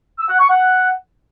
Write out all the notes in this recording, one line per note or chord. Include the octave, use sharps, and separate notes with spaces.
E6
F#5
C#6
F#5